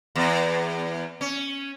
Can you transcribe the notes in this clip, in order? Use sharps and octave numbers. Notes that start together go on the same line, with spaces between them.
E2
C#4